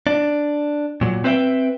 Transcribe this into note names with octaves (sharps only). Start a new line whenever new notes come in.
D4
A#2 F#3
C4 B4 C5 D#5 E5 G5